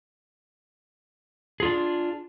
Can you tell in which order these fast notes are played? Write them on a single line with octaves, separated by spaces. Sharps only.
G#4 F4 D4